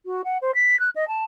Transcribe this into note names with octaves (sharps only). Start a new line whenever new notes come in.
F#4
F#5
C5
B6
F#6
D#5
A5